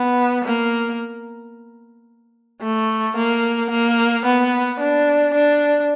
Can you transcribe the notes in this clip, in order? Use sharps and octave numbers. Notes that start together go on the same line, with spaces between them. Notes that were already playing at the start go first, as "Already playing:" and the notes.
Already playing: B3
A#3
A3
A#3
A#3
B3
D4
D4